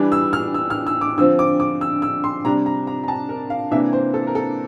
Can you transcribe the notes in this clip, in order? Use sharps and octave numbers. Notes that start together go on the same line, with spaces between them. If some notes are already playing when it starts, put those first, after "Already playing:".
Already playing: E3 G3 D4
E6
F6
E6
F6
E6
D6
D3 F3 C4 E6
D6
D6
E6
E6
C6
C3 G3 D4 A#5
A#5
A#5
A#5
A5
A#4
F5
C3 E3 A#3 D4 E5
C5
A4
A#4
A4